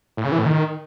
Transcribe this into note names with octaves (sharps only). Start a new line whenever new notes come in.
A2
C#3
E3
A2
D#3